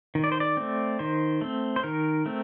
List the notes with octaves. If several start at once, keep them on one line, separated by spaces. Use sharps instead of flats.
D#3
D5
C5
D5
A3 C4
D#3 C5
A3 C4
C5
D#3 A#4
A3 C4